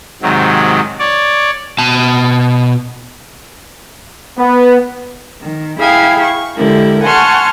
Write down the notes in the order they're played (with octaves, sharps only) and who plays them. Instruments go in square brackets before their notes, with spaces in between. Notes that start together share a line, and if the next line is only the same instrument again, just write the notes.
[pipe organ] G#2 C3 D#3 F#3
C#5 D5
[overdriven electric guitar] B2 A5
[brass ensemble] B3
[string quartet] D#3
E4 G#4 F5 G5 G#5
C#6
D3 G#3 E4 G4 A#4
F#5 G#5 A5 C6 C#6 F6